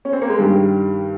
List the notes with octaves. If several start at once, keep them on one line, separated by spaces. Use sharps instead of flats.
C#4
C4
A#3
G#3
G2 D#3 G3